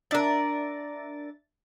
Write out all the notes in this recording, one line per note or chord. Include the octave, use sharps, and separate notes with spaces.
D4 A#4 D5 E5 A6